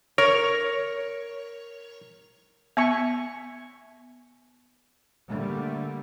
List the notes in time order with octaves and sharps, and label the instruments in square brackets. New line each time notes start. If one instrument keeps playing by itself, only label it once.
[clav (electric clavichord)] A#4 [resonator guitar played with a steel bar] C#5
[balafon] B3 [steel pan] E5 G#5 C#6
[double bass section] D3 G3 A3 A#3